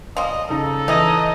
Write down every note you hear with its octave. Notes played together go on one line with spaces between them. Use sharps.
F3 G3 D#5
C#3 D#4 A4
E3 D#4 E4 D#5